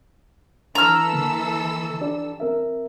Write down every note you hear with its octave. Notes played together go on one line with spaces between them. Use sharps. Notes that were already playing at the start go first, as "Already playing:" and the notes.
E3 D4 A4 A#5 E6 F6
D3 A#3
D4 G4 D5
C4 A#4 E5